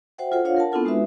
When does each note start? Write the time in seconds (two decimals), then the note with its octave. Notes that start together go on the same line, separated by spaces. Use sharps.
0.18 F#4 C5 E5 F#5 G5
0.32 F4 A4 C5 F#5
0.45 D4 F4 C#5 F5 F#5
0.56 A#4 F#5 A5
0.72 B3 C4 D4 E4 F4 A4
0.85 G#3 D#4 F#4 B4 E5